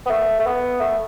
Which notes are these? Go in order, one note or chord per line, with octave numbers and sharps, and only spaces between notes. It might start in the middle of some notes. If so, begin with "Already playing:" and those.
B3
A3
A3
B3
A3